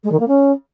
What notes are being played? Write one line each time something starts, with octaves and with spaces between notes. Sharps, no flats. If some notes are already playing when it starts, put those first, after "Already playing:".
G#3
D#3
A#3
C#4